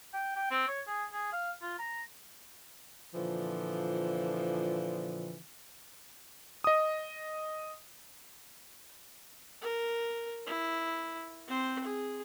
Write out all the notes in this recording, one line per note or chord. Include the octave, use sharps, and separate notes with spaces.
G5
G5
C4
C#5
G#4
G#4
F5
F4
A#5
A#2 D3 E3 F3
D#5 D#6
A#4
E4
C4 C5
G#4